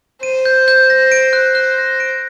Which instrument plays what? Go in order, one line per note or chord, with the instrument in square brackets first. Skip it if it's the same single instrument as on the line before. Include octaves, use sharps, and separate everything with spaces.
[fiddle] C5 [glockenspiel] D#7
[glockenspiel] G6
G6
A#6
D7
F#6
F#6
A#6
D7